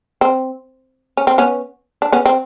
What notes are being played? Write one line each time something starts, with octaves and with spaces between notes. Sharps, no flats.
C4
C#4
C4
B3 C#4
D4
B3 C#4
C4